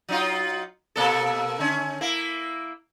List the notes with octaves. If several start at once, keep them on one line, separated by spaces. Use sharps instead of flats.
F#3 D#4 F4
B2 A#3 A4
D3 C#4
A#3 E4